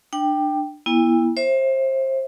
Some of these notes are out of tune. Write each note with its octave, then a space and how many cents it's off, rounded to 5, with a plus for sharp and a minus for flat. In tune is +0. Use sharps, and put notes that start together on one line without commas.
D4 +25 G5 +0
B3 -40 E4 +0 G5 +45
C5 +25 E5 +0